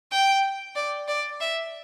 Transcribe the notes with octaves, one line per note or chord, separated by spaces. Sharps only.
G5
D5
D5
E5